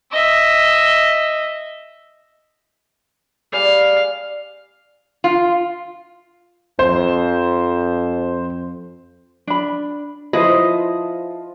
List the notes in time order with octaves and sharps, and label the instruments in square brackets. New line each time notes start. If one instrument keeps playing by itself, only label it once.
[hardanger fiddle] D#5 E5
[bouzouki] G3 G#4 D5 [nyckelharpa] F5
[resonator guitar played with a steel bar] F4
[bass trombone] F2 [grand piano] C5
[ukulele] D4 B5
[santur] F3 [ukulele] E4 B4 C5 [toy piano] F4 [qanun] D#5